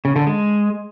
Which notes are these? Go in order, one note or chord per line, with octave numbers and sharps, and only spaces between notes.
C#3
D3
G#3